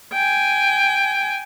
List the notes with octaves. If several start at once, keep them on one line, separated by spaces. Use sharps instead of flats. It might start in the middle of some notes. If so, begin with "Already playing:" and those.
G5 G#5